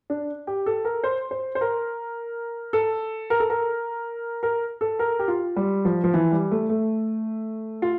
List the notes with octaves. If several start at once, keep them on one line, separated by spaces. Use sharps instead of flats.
D4
G4
A4
A#4
C5
C5
C5
A#4
A4
A#4
A4
A#4
A#4
A4
A#4
G4
F4
G3
F3
F3
E3
G3
A3
A3
F4